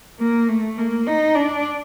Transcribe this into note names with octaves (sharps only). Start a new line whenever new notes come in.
A#3
A3
A#3
D#4
D4